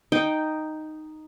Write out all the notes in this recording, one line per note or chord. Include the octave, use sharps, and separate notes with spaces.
D#4 G5